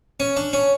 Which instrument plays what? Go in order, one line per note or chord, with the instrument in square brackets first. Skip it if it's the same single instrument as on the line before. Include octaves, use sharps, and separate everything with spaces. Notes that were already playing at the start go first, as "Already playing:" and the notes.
[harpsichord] C#4
D4
C#4